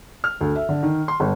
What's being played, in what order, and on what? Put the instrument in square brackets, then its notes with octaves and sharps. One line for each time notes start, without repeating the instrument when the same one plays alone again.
[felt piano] F6
D2
E5
D3
D#3
C6
G1